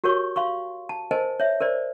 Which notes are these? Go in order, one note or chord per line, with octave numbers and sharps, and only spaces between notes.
F#4 G4 A#4 C#5 C#6
F5 C6 C#6
A5
A#4 C5 D#5 G#5 A5
C#5 E5
A#4 C5 D5